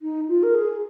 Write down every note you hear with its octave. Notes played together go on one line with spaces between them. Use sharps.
D#4
F4
A#4
G#4